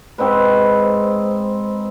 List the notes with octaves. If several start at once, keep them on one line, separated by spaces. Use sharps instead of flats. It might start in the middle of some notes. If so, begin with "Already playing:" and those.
G#2 C4 D#4 B4